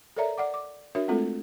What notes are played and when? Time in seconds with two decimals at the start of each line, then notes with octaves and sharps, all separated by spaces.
0.17 A4 A#4 C#5 D5 E5 A#5
0.38 D5 F#5 D6
0.54 D6
0.95 D4 F#4 A#4 C#5 E5
1.08 G#3 A3 C4 F4 A4